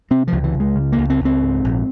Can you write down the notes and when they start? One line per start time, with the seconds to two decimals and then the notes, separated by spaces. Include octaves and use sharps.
0.11 C3 C4
0.27 C#2 F3
0.44 E3
0.54 C#2
0.60 G#3
0.76 C#3
0.92 A#3
0.98 C#2
1.10 C4
1.20 C#2 C4
1.42 G#2
1.64 A#1